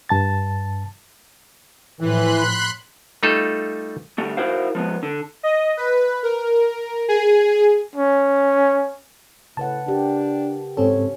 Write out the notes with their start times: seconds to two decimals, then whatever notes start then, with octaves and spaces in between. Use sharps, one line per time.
0.09 G2 A5 A6
2.00 A2 E3 F3 B5 C6 F#6
3.23 G3 A3 D#4 F4 A4
4.18 D3 G3 A3
4.37 E4 F#4 A#4 C5 F5
4.75 F3 G#3 B3
5.03 D3
5.43 D#5
5.77 B4
6.23 A#4
7.08 G#4
7.96 C#4
9.57 A2 C#3 B4 F#5 A5
9.88 D4 G4 A#4
10.77 G#2 C4 C#4 A4 C#5